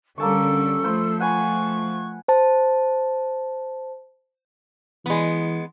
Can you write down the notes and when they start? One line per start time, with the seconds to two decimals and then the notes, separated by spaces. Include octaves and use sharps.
0.18 D3 G3 A#3 C#4 A4 A5 C#6
0.84 F3 A3 C5 B5
1.20 F#5 G#5 B5 C#6
2.28 C5 A5
5.06 E3 G#3 B3